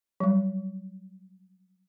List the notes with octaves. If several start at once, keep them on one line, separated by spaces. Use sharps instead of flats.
F#3 G3